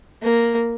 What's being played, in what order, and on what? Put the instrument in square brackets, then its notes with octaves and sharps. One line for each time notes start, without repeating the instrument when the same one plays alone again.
[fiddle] A#3